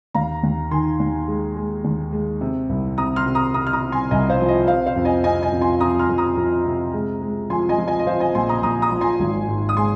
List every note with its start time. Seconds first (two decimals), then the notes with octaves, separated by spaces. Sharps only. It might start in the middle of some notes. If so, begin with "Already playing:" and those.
0.14 D#2 F5 A#5
0.43 D#2
0.71 D#3 G#5 C6
1.00 D#2
1.28 G#3
1.56 G#3
1.84 D#2
2.13 G#3
2.41 C3
2.69 C2
2.98 C3 A#5 D#6
3.16 C6 F6
3.26 C3
3.35 A#5 D#6
3.54 C3 A#5 D#6
3.67 F6
3.73 A#5 D#6
3.83 C3
3.92 G#5 C6
4.11 C2 D#5 G#5
4.29 C5 F5
4.39 F3
4.48 D#5
4.67 C3 C5 F5
4.86 C5 F5
4.96 F2
5.05 D#5 G#5
5.24 C3 D#5 G#5
5.43 D#5 G#5
5.52 F2
5.61 G#5 C6
5.80 F2 A#5 D#6
5.99 C6 F6
6.09 F2
6.18 A#5 D#6
6.37 F2
6.66 C3
6.94 G#3
7.22 G#3
7.50 F3 G#5 C6
7.69 D#5 G#5
7.78 F3
7.88 D#5 G#5
7.99 D#5
8.07 F3 C5 F5
8.20 D#5 G#5
8.35 A#1 G#5 C6
8.49 A#5 D#6
8.63 A#1 A#5 D#6
8.82 A#5 D#6
8.92 F3
9.01 G#5 C6
9.20 G#1
9.48 G#2
9.69 D#6
9.77 G#3 G#5 C6